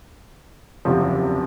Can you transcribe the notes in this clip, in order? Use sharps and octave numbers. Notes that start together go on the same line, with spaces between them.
F#1 E2 C3 F3